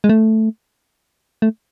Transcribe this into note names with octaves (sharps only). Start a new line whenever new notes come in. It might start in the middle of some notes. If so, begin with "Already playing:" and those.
G#3
A3
A3